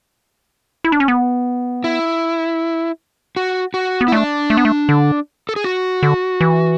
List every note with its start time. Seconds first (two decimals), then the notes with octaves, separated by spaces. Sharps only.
0.84 E4
0.92 D4
1.00 C#4
1.08 B3
1.84 E4
3.36 F#4
3.74 F#4
4.01 B3
4.08 E4
4.12 A3 D4
4.50 A3
4.57 B3
4.65 A3
4.89 D3
5.49 A4
5.56 G#4
5.64 F#4
6.03 D3
6.41 E3